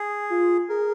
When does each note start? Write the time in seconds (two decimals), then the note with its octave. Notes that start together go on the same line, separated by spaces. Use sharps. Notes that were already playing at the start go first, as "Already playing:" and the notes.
Already playing: G#4
0.30 F4
0.69 G#4 A#4